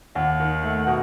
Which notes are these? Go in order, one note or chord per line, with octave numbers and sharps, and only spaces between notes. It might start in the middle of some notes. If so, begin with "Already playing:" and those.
D#2 F#5
D#3
A3
B2